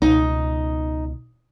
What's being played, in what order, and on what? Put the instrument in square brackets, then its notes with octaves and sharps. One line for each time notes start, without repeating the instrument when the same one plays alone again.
[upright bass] C#2 B2 [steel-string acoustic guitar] D#4